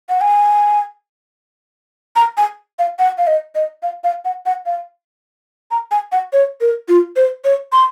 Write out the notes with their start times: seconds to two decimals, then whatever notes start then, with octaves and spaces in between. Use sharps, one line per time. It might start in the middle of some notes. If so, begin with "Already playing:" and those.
0.09 F#5
0.21 G#5
2.16 A#5
2.37 G#5
2.79 F5
2.99 F#5
3.18 F5
3.27 D#5
3.55 D#5
3.83 F5
4.04 F5
4.25 F#5
4.46 F#5
4.66 F5
5.71 A#5
5.91 G#5
6.12 F#5
6.33 C#5
6.61 A#4
6.89 F4
7.16 C5
7.44 C#5
7.73 C6